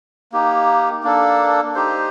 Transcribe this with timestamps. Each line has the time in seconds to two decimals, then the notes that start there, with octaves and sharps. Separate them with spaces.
0.32 A#3 D#4 G4
1.04 A#3 D4 A4
1.75 D#4 G4 C5